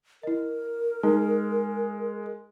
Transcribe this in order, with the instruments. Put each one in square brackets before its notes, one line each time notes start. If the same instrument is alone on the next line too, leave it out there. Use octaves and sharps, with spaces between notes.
[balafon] E4 D#5 [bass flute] A#4
[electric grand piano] G#3 [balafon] D#4